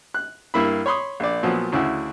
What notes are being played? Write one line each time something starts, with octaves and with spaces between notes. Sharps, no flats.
F#6
G2 A#3 E4 B5
C#5 B5 C6 D#6
A#1 D5
A#2 F3 F#3 B3
D2 C#3 E4 F#4